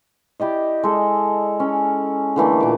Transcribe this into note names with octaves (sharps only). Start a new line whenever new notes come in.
E4 G4 D5 D#5
G#3 A4
C#4
D3 E3 A3 A#3
A#2 D6